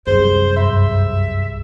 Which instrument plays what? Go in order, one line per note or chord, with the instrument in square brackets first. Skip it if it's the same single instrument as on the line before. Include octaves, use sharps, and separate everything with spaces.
[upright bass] C2 F#2 [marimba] G#4 [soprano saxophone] C5
[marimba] G2 C6 [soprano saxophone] E5